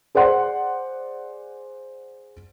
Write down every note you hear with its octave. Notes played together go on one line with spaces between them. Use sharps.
G#4 C5 D5 F#5 C6